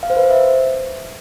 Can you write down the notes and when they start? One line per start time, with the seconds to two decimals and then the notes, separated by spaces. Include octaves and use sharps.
0.03 F5
0.10 C5
0.17 B4
0.24 C5
0.31 E5